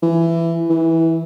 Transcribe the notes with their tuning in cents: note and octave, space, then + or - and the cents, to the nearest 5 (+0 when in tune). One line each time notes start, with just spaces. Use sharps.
E3 +15
E3 -15